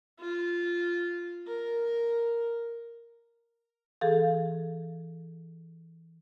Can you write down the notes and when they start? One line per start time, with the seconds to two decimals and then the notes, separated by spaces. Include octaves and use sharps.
0.20 F4
1.47 A#4
4.01 E3 G#4 A4 F5